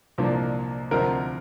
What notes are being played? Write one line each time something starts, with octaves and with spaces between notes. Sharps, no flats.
C2 A#2 F3 A#3 D4
D2 C3 F3 C4 A#4